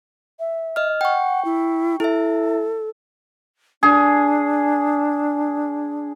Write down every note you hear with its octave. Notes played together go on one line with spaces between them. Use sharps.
E5
D#5 F6
F#5 G5 C#6
E4
E4 A4 E5
D4 G#4